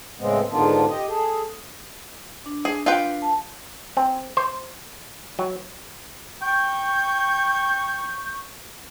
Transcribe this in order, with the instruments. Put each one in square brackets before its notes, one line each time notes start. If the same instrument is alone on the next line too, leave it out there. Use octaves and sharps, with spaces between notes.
[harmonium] A2 C#3 G#3 B3 C4
G#2 D3 D#3 B3 D4 F4
G4 D#5
G#4 A4
[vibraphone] D4
[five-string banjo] G#4
F4 B4 G5
[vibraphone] A5
[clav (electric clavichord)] C4
C5
F#3
[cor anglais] G5 [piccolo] C#6 [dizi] G6